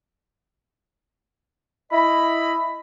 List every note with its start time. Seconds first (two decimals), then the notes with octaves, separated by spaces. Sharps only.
1.92 E4 D#5 B5